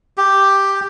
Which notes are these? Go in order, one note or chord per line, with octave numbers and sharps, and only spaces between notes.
G4